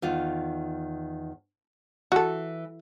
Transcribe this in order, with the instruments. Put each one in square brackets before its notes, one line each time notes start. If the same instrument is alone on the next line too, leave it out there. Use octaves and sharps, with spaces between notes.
[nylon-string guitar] E2 D#3 F4
[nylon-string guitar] E3 [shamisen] F#4 A4